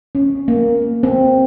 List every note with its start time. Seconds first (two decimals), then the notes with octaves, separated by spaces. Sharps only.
0.15 C#4
0.48 A#3
1.03 C4